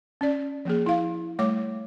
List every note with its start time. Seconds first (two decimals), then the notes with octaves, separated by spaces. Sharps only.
0.21 C#4 D5
0.65 F3 A#3 G#4
0.86 E4 F5
1.39 G3 A3 C#5 D6